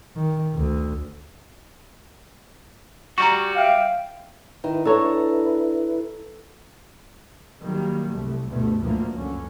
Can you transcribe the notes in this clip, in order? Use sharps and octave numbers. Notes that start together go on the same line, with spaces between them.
D#3
D2
G3 F#4 A#5 C#6
E5 F5 G5
D#3 E4 B4
D4 A4 C#5 A#5
D#3 F#3 G3 A#3
C2 A3
D2 G2 B2 A3
D2 A2 E3 F3 A#3
C#2 F#2 D3 C#4